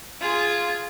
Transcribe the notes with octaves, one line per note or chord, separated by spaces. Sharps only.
F4 G#4